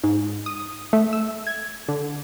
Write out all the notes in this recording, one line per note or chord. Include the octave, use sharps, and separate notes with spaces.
G#2
D#6
A3
E6
G#6
D3